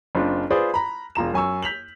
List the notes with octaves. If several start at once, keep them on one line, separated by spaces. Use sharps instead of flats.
F#1 C4 D4 F4
F4 G#4 B4 C5 D5
A#5 B5
E1 F4 A#5 E7
F#2 G#5 C#6 E6
G6 B6 F7 F#7